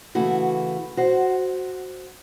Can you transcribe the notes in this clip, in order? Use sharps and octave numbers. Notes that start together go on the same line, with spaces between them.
C#3 E3 A3 E4 F#4
F#4 C5